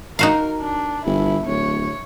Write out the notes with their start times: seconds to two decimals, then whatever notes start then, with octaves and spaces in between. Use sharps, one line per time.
0.19 D#4 F#4 A#4 F5
0.61 D4
1.06 G1 E4
1.46 D1 C#5